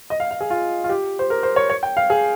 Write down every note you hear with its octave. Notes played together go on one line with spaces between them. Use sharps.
D#5
F5
F5
G#4
F4
F4
G4
C5
A#4
C5
C#5
C#5
G5
F5
G#4